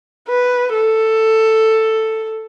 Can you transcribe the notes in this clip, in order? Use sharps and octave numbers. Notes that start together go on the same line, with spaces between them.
B4
A4